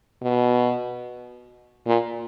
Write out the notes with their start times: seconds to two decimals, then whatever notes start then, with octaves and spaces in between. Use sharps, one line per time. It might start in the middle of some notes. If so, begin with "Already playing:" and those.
0.22 B2
1.87 A#2